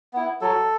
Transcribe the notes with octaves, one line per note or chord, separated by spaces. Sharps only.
B3 E4
F#3 A4